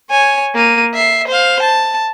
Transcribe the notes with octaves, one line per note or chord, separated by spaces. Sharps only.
C#5 G#5
A#3 D#7
E5 C7
C5 F5
A5